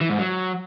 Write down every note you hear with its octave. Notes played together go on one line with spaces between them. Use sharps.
E3
G#2
F#3